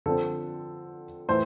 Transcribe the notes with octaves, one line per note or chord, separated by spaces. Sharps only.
D3 F3 C4 A4
A2 E3 A3 C5